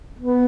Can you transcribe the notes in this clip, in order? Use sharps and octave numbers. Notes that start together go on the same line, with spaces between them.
B3